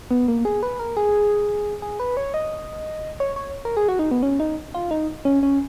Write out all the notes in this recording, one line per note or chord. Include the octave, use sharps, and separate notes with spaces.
B3
A#3
G#4
B4
A#4
G#4
G#4
B4
C#5
D#5
C#5
C#5
A#4
G#4
F#4
D#4
B3
C#4
D#4
F4
D#4
C#4
C#4